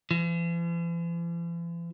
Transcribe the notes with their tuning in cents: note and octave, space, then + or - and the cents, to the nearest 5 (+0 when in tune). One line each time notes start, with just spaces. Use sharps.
E3 +45